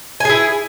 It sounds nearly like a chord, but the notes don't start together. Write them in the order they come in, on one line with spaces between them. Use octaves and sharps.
G#5 G#4 E4